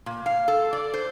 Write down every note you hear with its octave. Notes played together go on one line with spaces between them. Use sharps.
A#2
F5
A4
D5
C5